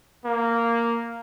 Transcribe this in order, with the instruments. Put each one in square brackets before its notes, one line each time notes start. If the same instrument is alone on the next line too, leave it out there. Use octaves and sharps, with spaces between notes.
[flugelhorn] A#3